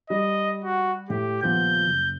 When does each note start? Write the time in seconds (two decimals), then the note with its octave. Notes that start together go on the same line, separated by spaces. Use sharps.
0.10 G3 D#5
0.64 F#4
1.10 A2 G4
1.42 D#1 F3 B3 G6
1.87 F#1